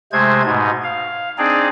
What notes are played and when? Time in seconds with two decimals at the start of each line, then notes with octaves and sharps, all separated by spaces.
0.12 C3 G#3 A3 C5 G#6
0.45 G#2 B2 D#4
0.84 F5
1.38 C4 D4 D#4 G#4 D5